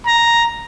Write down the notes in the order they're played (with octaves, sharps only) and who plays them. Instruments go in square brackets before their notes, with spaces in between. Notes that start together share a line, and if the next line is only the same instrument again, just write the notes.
[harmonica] A#5